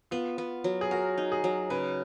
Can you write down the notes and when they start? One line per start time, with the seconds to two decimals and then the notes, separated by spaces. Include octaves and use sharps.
0.11 B3 F4
0.38 B3
0.64 F#3
0.81 G#4
0.91 F#4 A#4
1.18 D#4
1.32 G#4
1.44 F#3
1.70 C#3 B4